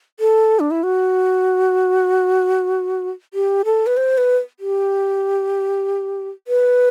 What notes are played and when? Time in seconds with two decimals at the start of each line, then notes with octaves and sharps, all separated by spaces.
0.20 A4
0.60 D4
0.71 E4
0.83 F#4
3.34 G4
3.65 A4
3.87 B4
3.97 C5
4.18 B4
4.60 G4
6.48 B4